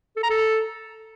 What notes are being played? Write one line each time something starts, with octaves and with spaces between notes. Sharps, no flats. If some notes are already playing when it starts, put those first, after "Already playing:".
A4
A#5
A4